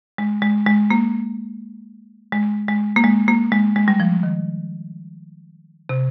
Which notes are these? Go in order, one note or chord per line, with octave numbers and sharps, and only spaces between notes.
G#3
G#3
G#3
A#3
G#3
G#3
A#3
G#3
A#3
G#3
G#3
G3
F3
D#3
C3